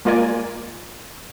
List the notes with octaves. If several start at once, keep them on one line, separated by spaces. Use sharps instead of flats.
G#3 A#3 F4 A#4 D5 G#5